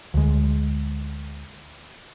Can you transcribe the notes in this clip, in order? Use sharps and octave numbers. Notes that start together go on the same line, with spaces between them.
D2 G#3